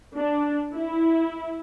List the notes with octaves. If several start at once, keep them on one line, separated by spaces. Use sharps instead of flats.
D4
E4